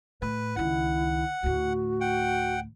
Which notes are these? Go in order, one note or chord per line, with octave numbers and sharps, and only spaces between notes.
A2 B4
C#2 D#3 E4 F#5
D2 A2 F#4
F#5 G5